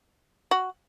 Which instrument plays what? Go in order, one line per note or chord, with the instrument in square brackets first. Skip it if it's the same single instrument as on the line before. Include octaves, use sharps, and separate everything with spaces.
[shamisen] F#4